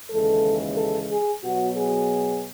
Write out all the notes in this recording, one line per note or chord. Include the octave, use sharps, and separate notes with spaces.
D#2 C#3 E3 G#3 A4
A4
G#4
B2 F#3 B3 F#4
G#4